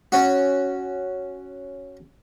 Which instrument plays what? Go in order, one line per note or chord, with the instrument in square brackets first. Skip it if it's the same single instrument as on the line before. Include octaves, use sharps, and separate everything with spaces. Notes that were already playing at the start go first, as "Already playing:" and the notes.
[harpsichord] C#4 F#4